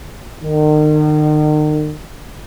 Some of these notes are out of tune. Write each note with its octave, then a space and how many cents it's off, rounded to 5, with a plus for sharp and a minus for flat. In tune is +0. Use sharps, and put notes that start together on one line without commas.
D#3 -40